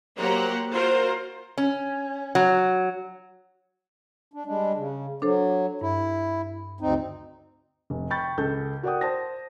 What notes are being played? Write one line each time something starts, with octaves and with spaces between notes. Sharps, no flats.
F#3 A#3 G4 C5 F#5 A#5
F4 F#4 A#4 C5
C#4
F#3
D4
G3 G#3 D4
C#3
F#3 D4 A4 C5
G2 E4
D2 C4 D#4
F1
G5 B5 C#6 G6 A6
C#2 A4 G6
F#4 A#4 D5 F#5 G5 D#6
C5 A5 A#6